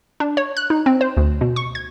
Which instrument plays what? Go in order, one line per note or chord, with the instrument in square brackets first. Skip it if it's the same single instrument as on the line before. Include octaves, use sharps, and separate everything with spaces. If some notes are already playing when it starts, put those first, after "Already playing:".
[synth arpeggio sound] D4
C#5
F#6
D#4
C4
C5
D2
B2
C#6
G#6